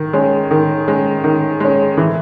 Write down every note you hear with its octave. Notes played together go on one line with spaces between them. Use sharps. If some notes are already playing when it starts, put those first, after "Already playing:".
Already playing: D#3
G#3 C#4
D#3
G#3 C#4
D#3
G#3 C#4
E3